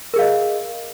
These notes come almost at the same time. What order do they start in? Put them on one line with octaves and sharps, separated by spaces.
A#4 G#4 F5 D#5